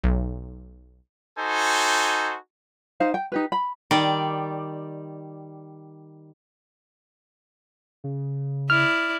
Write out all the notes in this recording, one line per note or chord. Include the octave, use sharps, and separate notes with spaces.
B1
D#4 F#4 A4 C5 G#5
D#4 C5 F5
G5
D#4 G4 B4
B5
D#3 G3 D5
C#3
E4 D5 F6